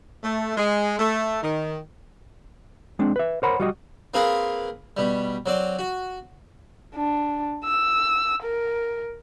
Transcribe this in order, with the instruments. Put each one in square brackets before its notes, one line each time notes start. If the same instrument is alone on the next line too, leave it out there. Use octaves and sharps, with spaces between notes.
[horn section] A3
G#3
A3
D#3
[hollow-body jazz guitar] G#3 C4 D4
B4 E5
A#4 C5 C#5 F#5 A#5 B5
G3 F#4 D#5
[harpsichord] A#3 C4 F4 G#4 A#4 B4
B2 G3
F#3 C4 D5
F#4
[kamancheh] D4
E6
A#4